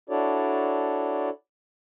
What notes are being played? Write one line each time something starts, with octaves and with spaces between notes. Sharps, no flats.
D4 E4 F#4 A4 C#5 D5